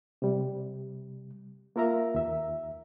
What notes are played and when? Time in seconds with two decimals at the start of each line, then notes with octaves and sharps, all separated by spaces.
0.22 C3 G3
1.76 A#3 F4 A#4 E5 A#5
2.14 D#2 E5